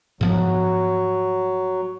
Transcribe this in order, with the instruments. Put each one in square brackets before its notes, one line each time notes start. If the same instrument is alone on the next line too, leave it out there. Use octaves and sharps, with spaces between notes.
[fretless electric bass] G#2 F3 B3 [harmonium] F#3